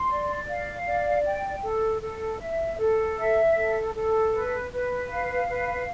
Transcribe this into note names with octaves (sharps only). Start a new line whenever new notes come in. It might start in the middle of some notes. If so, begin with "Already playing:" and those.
Already playing: C6
D5
F5
D5
G5
A4
A4
E5
A4
E5
A4
A4
B4
B4
F5
B4